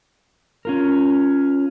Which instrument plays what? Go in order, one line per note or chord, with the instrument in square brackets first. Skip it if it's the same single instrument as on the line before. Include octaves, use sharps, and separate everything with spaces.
[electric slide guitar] C#4 F4 A#4